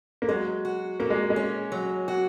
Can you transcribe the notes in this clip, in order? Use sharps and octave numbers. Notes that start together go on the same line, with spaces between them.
A#3
F#3 G#3
F#4
A#2 A#3
G#3
G#3
C#4
F#3
F#4